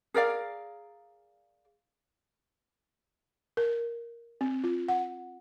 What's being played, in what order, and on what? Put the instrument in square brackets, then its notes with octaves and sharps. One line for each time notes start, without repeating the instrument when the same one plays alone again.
[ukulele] G#4 A#4 D5 F5
[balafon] A#4
C4
F4
F#5